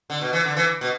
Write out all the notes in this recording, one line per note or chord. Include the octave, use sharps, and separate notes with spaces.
D3
B2
E3
D3
E3
B2